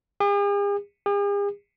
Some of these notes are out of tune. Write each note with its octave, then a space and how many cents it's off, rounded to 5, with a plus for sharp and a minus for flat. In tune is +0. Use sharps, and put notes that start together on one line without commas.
G#4 -45
G#4 -45